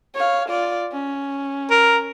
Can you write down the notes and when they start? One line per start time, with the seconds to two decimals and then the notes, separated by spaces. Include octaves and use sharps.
0.14 C#5 F5
0.48 F4 D5
0.92 C#4
1.71 A#4